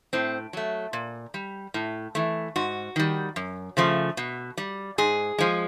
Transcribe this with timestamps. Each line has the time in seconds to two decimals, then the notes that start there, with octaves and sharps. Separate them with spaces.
0.13 A2 C4
0.53 F#3 A3
0.93 A#2
1.34 G3
1.74 A2
2.15 E3 A3
2.56 G#2 F#4
2.96 D#3 G3
3.36 F#2
3.77 C#3 F3 A3
4.17 B2
4.57 G3
4.98 G#2 G#4
5.39 F3 G#3